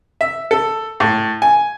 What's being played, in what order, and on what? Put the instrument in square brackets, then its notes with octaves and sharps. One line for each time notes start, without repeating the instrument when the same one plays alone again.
[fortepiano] E5
A4
A2
G#5